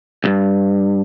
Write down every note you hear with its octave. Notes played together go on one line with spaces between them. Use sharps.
C2 G2